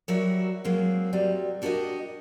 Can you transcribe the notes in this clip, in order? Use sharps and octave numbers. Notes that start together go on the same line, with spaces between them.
F#3 G3 F#4 A#4 C#5 E5
F#3 G#3 A#3 C4
C3 F#3 G3
D4 F#4 G4 A4 A#4 D#5